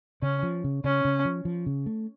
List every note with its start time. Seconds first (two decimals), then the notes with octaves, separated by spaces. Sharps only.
0.22 C#3 C#4
0.43 F3
0.64 C#3
0.84 C#3 C#4
1.05 C#3
1.25 F3
1.45 F3
1.66 C#3
1.86 A3